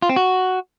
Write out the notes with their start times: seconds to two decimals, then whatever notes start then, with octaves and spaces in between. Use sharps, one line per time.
0.02 F4
0.09 C4
0.16 F#4